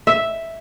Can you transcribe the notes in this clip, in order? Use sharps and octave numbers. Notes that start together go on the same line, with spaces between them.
E5